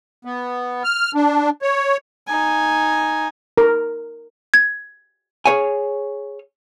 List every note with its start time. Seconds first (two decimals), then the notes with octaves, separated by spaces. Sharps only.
0.25 B3
0.84 F6
1.15 D4
1.62 C#5
2.28 D#4 G#5
3.58 A#4
4.54 G#6
5.46 G#4 C5 C#5 F5 G#5